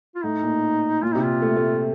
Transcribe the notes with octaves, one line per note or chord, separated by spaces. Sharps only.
F4
A2 D#4
A#2
A#2 F4
C3 D#4
F4
A3
A3